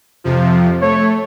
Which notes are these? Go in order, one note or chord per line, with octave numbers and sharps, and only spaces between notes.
F2 C3 F3
A3 C#5